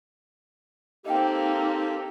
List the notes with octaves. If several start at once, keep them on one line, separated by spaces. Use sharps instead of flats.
A#3 C4 D#4 G4 A4 D#5 F5 G5